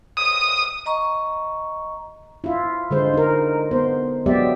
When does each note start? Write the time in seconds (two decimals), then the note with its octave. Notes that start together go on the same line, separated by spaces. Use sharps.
0.17 D#6
0.86 D#5 A#5 C#6
2.44 E4 F4
2.91 D3 G#3 C5
3.14 D#4 A#4
3.71 B3 C5
4.26 F#3 G#3 B3 G4 D5 E5